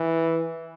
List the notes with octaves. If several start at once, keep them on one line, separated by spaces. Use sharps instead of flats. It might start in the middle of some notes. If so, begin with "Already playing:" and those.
Already playing: E3